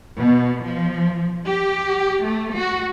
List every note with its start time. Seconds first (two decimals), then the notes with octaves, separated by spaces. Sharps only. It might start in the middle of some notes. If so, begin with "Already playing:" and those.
0.18 B2
0.64 F3
1.47 G4
2.24 A3
2.55 F#4